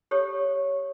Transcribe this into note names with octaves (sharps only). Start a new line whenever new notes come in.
G4 A4 C#5